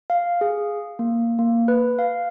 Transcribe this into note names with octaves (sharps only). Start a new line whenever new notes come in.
F5
G#4
A#3
A#3
B4
F5